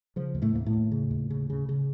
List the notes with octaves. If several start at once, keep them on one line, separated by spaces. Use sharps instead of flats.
C#3 F3
D#2
A2 A3
D#2 A#3
A2 A3
D#2
C#3
D#2
C#3
C#3
C#3